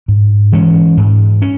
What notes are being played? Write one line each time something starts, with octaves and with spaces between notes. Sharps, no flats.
G#2
E3 G#3 C#4
G#2
C#4